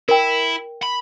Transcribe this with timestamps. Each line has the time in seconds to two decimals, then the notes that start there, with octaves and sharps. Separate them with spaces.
0.09 E4 A#4 G5
0.83 B5